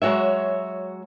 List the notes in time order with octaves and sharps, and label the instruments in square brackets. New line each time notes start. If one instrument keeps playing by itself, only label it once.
[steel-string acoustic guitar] F#3 G#3 F#4 C#5 E5